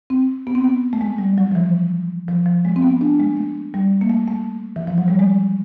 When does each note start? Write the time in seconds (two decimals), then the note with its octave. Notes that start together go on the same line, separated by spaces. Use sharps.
0.10 C4
0.47 B3
0.55 C4
0.64 B3
0.93 A3
1.01 G#3
1.18 G3
1.38 F#3
1.51 F3
1.55 E3
2.28 F3
2.46 F3
2.65 G#3
2.76 C4
2.82 B3
3.01 D4
3.20 G#3
3.37 A3
3.74 G3
4.01 A#3
4.10 A3
4.28 A3
4.76 E3
4.87 F3
4.98 F#3
5.08 G3
5.19 G#3